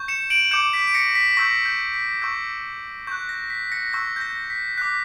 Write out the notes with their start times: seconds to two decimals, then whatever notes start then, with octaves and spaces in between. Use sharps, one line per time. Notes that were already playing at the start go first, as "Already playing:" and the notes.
Already playing: C#6 G6
0.08 C#7 E7
0.30 D7 F#7
0.51 D6 G6 C#7 E7
0.73 B6 D7
0.87 D7
0.94 A#6 C#7
1.15 B6
1.37 C#6 E6 G6 A#6
1.65 G6
1.94 B6
2.22 C#6 E6 G6
3.07 C#6 F#6 G6
3.29 A#6
3.50 B6
3.72 A#6 C#7
3.92 C#6 E6 G6 A#6
4.16 G6
4.21 A#6
4.50 B6
4.77 D6 F#6 B6